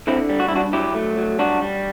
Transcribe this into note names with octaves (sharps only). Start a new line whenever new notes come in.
D3 C4 E4
G3
F#4
E4
G2 D4 F#4
F#3 E4 G4
A3
F#3
G3 D4 F#4
G3